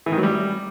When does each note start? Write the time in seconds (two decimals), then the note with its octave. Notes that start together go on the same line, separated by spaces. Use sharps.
0.06 E3
0.12 D#3
0.18 F#3
0.23 G3